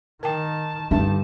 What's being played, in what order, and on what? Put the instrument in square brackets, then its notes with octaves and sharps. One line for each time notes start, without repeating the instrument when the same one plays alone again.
[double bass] D#3 [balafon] A#4 G5 [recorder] A5
[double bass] G2 D3 [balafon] D4 E5 [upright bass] D#4 [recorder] A5